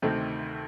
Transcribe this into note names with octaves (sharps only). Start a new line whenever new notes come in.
D2 C3 D#3 A3 C4